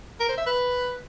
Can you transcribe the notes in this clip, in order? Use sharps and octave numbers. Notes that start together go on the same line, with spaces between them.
A#4
C5
E5
B4